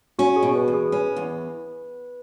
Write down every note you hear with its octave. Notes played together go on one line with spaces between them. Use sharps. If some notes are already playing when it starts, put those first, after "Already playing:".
C#4 F#4
G#4
B2
B4
E2
G#4
C#4 B4
E2